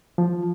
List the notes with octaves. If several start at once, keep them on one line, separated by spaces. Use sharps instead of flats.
F3